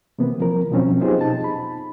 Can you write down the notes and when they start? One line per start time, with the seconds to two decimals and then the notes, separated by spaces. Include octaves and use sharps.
0.19 C3 E3 A#3 B3
0.40 F3 C4 A#4
0.71 B2 F3 F#3 C4 C#4
1.01 B3 D#4 F4 G4 G#4 C5
1.21 B2 D#4 A5
1.44 B5